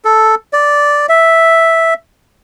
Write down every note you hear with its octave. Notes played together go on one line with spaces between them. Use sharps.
A4
D5
E5